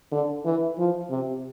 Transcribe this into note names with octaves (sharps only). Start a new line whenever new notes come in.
D3
E3
F3
C3